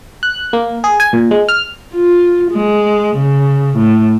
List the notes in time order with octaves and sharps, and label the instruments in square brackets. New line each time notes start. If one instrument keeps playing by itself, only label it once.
[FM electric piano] F#6
A#3
G#4
G#5
A#2
G#3
F6
[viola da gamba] F4
G#3
C#3
A2